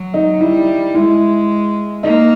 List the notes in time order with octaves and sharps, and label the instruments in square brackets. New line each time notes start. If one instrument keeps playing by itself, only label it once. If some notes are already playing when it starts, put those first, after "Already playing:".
Already playing: [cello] F#3
[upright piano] D#4
[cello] G3 [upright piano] E4
[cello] G#3 [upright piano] E4
[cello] A#3 [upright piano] D#4